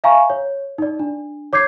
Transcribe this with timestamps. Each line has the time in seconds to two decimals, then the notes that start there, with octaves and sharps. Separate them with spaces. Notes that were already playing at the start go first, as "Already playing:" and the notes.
0.04 E5 F5 G#5 A#5 C#6
0.30 C#5
0.78 D#4 D5
0.99 D4
1.53 C#5 D6 G6 G#6 C7